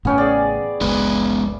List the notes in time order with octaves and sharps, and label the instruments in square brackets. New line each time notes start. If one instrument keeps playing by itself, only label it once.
[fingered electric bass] A1 A2 C#3 [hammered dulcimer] B3 C#4 G5
[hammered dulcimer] G#4 D5
[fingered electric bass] F#1 C#2 [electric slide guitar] G#3 B3 B4